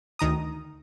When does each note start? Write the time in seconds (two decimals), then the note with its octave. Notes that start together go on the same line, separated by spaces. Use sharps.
0.19 D2 D#3 A#5 D#6